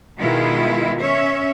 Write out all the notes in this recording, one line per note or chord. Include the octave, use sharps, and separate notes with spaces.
B2 D#3 G#3 E4 F4
C#4 C#5 E5